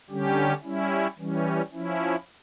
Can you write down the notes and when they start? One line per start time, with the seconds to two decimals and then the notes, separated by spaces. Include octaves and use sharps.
0.10 D3 G3 C#4 G4
0.64 G3 C#4 E4
1.18 E3 G3 C#4
1.72 F3 C#4 E4